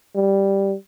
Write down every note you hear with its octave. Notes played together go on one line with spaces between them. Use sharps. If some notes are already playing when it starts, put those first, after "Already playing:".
G3